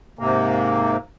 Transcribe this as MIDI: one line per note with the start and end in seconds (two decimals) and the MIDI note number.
0.19 0.97 44
0.19 0.97 48
0.19 0.97 58